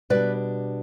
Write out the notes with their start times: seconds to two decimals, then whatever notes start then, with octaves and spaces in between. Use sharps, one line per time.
0.10 B2 G3 D4 B4 D5